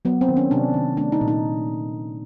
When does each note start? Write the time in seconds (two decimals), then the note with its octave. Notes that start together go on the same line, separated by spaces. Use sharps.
0.05 F#3 B3
0.21 C4
0.29 D#3
0.37 C#4
0.51 C3 D4
0.74 D#3
0.97 A3 D4
1.12 D#4
1.21 A#2
1.28 D#4